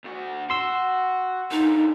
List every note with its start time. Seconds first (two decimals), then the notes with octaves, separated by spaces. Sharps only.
0.04 D2 F#4
0.50 F#4 C6 E6
1.51 A#2 D3 D#4